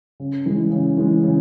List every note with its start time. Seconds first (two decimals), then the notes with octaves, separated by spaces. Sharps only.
0.20 C#3
0.46 E3 G#3
0.71 C#3
0.98 E3 G#3
1.23 C#3